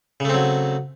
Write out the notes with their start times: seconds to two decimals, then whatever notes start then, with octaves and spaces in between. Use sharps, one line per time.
0.20 C#3
0.25 A3
0.29 C4
0.34 F#3